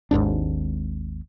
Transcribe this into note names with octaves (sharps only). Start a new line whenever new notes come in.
G#1 D#2 G#2 D4